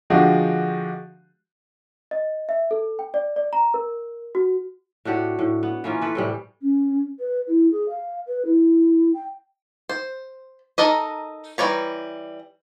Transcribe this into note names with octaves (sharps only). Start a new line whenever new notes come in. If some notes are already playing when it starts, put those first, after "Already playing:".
D3 F3 G#3 F#4 G4
D#5
E5
A4
G5
D5
D5
A#5
A#4
F#4
A2 D4 F#4 G4
A2
B3
E3 A#3 C#4 F4
E3 A4 B4
A2 C3 G3
C#4
B4
E4
G#4
F5
B4
E4
G5
C5
D#4 A4 A#4 D#5
E3 G3 C#5 A#5